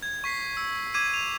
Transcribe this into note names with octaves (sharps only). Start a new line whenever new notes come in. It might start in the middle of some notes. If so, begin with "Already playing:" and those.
G#6
C#6 B6 C7
E6
D6 G#6 D#7
F7